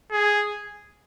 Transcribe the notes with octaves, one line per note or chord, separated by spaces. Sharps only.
G#4